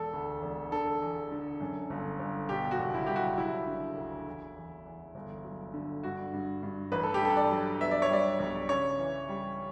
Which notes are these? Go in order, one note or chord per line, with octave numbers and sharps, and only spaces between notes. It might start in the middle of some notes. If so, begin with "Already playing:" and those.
Already playing: E1 A4
D2
E1
D3 A4
E2
D3
F#2
G1
G1
B2 G4
F#4
F#1
E4
G3 G4
F#4
F#3 E4
D3
D2
E2
E2
E2
G1
F#3
D3
G2 F#4
G2
G2
A1 B4
A4
G4
G2 A4
D5
F#3
B3 E5
D5
C#5
G3 D5
B1
C#3 C#5
E3
G3